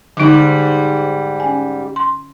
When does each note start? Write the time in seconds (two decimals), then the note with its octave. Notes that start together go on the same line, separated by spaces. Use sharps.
0.17 G#2 D3 G3 D#4
1.40 C#4 G#5
1.96 C6